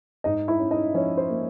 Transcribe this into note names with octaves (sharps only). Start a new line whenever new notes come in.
G#2 D#4 D#5
E4 E5
C#4
D#4 D#5
F3 C#4 C#5
C5
A#3